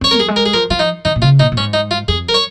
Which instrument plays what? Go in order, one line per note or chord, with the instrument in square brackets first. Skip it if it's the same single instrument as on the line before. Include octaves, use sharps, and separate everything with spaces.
[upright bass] C#4 [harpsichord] C#5
[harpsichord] A#4
[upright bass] F3 [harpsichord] G#4
[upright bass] G#3
[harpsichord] A#4
G#4
[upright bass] F3 [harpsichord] A#4
[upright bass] F3 [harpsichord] F4
[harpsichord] D#4
[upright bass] D#3 [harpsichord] D#4
[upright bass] A#2
[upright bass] C#3 [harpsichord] F4
[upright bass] A#2 [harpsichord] D#4
[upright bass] A#2
[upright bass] G#2 [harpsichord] C#4
[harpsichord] D#4
F4
[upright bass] F2 [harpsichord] G#4
[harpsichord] A#4
C#5